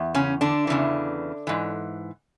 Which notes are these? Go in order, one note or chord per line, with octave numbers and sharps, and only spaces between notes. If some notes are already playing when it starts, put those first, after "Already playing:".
Already playing: E2
C#3 C#4
D3 D4
E2 C#3 E3
G#2 E3